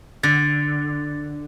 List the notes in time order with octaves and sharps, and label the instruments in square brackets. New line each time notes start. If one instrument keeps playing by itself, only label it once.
[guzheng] D3 [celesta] A6